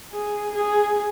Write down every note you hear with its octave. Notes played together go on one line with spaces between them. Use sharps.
G#4
G#4